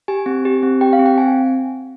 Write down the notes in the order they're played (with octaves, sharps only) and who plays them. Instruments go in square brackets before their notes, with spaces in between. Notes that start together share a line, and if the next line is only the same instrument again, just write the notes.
[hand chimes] G4 G#5
C4
G4
C4
G4 G5
F5
C4
G5
C4 G#5